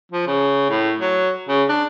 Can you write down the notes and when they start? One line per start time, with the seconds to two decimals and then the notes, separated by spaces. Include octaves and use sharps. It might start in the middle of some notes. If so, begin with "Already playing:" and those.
0.11 F3
0.26 C#3
0.69 A2
0.99 F#3
1.48 C#3
1.69 D4